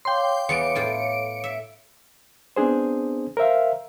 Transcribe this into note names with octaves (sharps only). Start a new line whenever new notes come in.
C#5 F5 G5 C6 D6
E2 B3 C#7 D7
A2 F4 G5
E5
B3 C4 D4 G#4 C5
A#4 C5 E5 F5